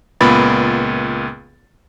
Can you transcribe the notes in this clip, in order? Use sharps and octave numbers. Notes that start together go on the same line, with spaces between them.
C#2 A#2 B3 B5 A6